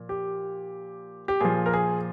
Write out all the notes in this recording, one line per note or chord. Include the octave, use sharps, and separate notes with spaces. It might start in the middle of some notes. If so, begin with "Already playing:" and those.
Already playing: A#2 F3
G4
G4
A#2 F3 G#4
A#4
G#4